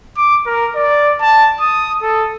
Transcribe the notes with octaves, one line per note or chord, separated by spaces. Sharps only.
D6
A#4
D5
A5
D#6
A4